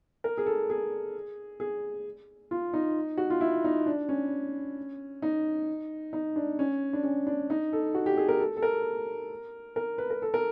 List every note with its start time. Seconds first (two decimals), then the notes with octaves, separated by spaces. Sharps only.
0.24 A#4
0.38 G#4
0.46 A4
0.70 G#4
1.60 G#4
2.51 F4
2.74 D#4
3.17 F#4
3.30 F4
3.41 E4
3.64 D#4
3.86 D4
4.09 C#4
5.22 D#4
6.13 D#4
6.36 D4
6.59 C#4
6.93 D4
7.03 C#4
7.27 D4
7.50 D#4
7.73 A4
7.94 F#4
8.06 G4
8.17 G#4
8.29 A#4
8.40 A4
8.57 A4
8.62 A#4
9.76 A#4
9.98 B4
10.10 A#4
10.22 A4
10.34 A#4